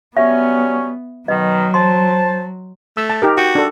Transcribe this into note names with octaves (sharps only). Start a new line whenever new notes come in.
F#3 G3 B3 C#4 E5
B2 D#3 F#3 D#5
C5 A5 C6
A3 E6
A5
D#4 G4 A#4
F#4 G5
D4 A4